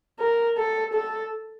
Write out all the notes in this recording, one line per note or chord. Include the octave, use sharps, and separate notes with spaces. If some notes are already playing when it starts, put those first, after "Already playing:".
A#4
A4
A4